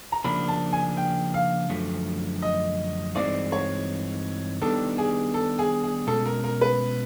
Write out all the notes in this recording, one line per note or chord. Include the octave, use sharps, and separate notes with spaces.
A#5
C#3 F3 A#3 D4 B5
A5
G#5
G5
F5
F#2 D3 F3 A3
D#5
G2 E3 G#3 C4 D#4 D5
C#5
D#3 G3 B3 D4 A4
G#4
A4
G#4
G#4
B2 G#3 C#4 A4
A#4
A#4
B4